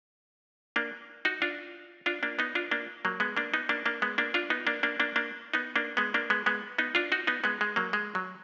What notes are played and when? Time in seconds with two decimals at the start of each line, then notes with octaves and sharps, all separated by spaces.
0.76 A#3 D4
1.25 D#4 F#4
1.42 D4 F4
2.06 D4 F4
2.23 A#3 D4
2.39 B3 D#4
2.55 D4 F4
2.71 A#3 D4
3.05 F#3 A#3
3.20 G#3 B3
3.37 A#3 D4
3.54 B3 D#4
3.69 A#3 D4
3.86 A#3 D4
4.02 G#3 B3
4.18 A#3 D4
4.34 D4 F4
4.50 B3 D#4
4.67 A#3 D4
4.83 A#3 D4
5.00 A#3 D4
5.16 A#3 D4
5.54 B3 D#4
5.76 A#3 D4
5.97 G#3 B3
6.14 A#3 D4
6.30 G#3 B3
6.46 G#3 B3
6.78 B3 D#4
6.95 D4 F4
7.12 D#4 F#4
7.27 B3 D#4
7.44 G#3 B3
7.61 G#3
7.76 F#3 A#3
7.93 G#3
8.15 F#3